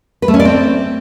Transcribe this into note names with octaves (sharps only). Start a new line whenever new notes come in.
B4
A3
C#4
D5
C4